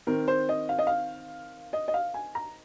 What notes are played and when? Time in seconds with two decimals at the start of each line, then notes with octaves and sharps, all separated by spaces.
0.07 D#3 C4 A#4
0.28 C5
0.49 D#5
0.69 F5
0.79 D#5
0.87 F5
1.73 D#5
1.88 D#5
1.94 F5
2.14 G#5
2.35 A#5